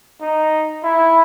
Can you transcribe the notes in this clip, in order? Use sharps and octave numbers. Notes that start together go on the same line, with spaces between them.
D#4
E4